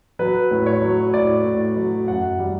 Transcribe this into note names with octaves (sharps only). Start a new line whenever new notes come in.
F#3 B4
A2
C#5
F#3
A2 D5
A2
F#3
F#2 F#5
G3